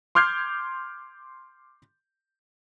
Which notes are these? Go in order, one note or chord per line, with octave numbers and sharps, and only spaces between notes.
C6 D6 F6 G6 G#6 C7